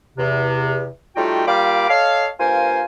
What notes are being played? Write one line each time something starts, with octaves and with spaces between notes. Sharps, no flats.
E2 C3
G3 A3 D#4 F4 F#4 G5
G3 A#3 F4 F5 B5 D6
A4 C#5 D#5 F5
G2 A#3 F4 C5 G#5